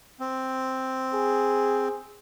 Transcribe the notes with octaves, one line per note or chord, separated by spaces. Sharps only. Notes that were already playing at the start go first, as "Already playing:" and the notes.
C4
G#4